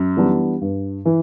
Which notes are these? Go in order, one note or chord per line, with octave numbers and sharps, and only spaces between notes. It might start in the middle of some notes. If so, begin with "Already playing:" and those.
Already playing: F#2
E3 G3 B3 D4
G2
E3